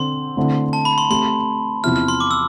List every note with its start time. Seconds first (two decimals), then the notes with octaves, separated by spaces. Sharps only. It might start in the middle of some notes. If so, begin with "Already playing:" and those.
Already playing: D3 C4 C6
0.37 D3 A3 C4 E4
0.73 A5
0.85 B5
0.98 C6
1.10 A3 C4 G4 C6
1.84 E2 C3 F3 C4 E4 F6
1.96 F6
2.08 C6
2.20 D6
2.31 E6